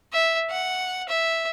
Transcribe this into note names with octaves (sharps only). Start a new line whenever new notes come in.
E5
F#5
E5